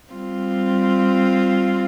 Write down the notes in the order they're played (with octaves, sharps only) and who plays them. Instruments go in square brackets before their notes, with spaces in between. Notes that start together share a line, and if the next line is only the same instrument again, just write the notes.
[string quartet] G3 C4 F4